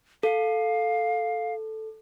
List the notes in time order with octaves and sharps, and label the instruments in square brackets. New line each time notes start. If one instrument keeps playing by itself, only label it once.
[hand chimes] A4 [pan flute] F5